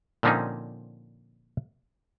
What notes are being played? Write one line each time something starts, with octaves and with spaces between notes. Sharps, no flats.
A#2 D3 F3 C4 C#4 D#4